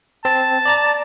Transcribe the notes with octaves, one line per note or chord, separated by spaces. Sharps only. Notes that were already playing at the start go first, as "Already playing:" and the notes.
C4 A5
D5 A#5 A6